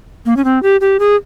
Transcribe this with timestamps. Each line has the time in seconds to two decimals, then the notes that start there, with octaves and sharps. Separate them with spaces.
0.26 A#3
0.37 C#4
0.45 C4
0.63 G4
0.81 G4
0.99 G#4